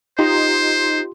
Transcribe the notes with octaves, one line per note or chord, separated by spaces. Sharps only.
D#4 F4 G4 C5 C6